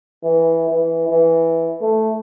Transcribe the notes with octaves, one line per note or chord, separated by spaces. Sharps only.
E3
E3
E3
A3